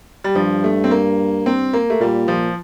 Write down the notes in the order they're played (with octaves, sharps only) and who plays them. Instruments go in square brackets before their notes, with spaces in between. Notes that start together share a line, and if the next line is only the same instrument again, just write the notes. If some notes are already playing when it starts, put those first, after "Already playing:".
[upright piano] G3
[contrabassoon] G2 [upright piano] F3
[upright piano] A3
C4
A#3
C4
A#3
A3
[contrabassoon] A#2 [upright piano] G3
[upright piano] F3